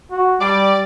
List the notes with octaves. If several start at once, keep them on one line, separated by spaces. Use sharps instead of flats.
F#4
G3 D5